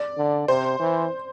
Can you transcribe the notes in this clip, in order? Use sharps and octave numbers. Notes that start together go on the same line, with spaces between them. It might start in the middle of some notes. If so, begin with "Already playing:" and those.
Already playing: D5
D3
C3 C5
E3